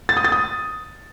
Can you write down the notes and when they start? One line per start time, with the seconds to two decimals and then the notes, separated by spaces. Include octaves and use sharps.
0.09 A6
0.17 D#6
0.24 A6
0.32 D#6